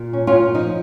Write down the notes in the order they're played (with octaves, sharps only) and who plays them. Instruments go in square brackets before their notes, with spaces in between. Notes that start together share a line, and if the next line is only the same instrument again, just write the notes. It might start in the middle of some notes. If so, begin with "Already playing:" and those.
Already playing: [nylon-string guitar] A#2
C#4
C#4 F4
F3 D#4